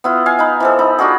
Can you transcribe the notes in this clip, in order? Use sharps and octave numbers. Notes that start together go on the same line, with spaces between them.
B3 E4 F4
F5 G#5
D#4 B4
E3 F3 A4
D#4 B5
D4 F4 F#4 G#4